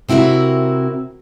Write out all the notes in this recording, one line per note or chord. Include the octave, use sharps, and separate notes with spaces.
C3 C4 E4 F#4 A#4